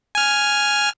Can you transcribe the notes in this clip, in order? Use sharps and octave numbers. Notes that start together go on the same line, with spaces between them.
G#5 F6